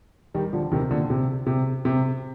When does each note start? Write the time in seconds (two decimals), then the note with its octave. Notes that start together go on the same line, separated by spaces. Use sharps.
0.34 D#3 G3
0.53 D3 F3
0.72 C3 D#3
0.91 A#2 D3
1.10 C3
1.47 C3
1.85 C3